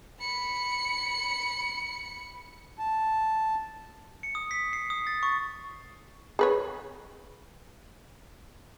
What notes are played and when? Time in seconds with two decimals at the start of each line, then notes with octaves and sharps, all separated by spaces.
0.20 B5 C#7
2.79 A5
4.23 C#7
4.35 D#6
4.51 B6
4.73 C7
4.90 D#6
5.07 A6
5.23 C#6
6.39 G#4 B4 C#5